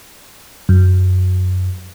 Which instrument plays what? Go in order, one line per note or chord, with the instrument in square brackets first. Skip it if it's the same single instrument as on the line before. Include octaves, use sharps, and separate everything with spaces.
[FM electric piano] F#2